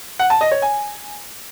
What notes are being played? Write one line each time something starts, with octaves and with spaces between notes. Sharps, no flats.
F#5
A5
D#5
C#5
G#5